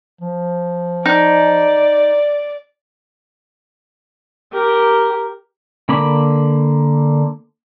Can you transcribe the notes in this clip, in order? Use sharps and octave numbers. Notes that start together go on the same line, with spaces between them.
F3
D#4 D5
G4 A#4
D3 A#3 B5 D6